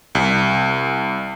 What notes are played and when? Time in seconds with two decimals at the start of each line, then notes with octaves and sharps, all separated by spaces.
0.15 C2